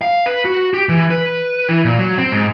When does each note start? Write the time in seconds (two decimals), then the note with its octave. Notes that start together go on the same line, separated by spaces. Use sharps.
0.02 F5
0.26 B4
0.45 F#4
0.74 G4
0.89 E3
1.10 B4
1.69 E3
1.85 A#2
1.99 F#3
2.18 C4
2.32 G#2